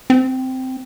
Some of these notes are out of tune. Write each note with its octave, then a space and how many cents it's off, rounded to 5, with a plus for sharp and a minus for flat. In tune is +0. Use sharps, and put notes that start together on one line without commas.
C4 -10